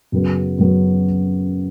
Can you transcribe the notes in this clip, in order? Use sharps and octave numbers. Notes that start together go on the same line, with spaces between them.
F#2 C#3 F#3 B3
F#2 C#3 F#3 B3